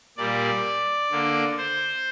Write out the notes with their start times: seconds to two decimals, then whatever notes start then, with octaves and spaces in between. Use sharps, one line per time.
0.17 A#2 G3 A#3 D5
1.11 D3 A#3
1.58 C5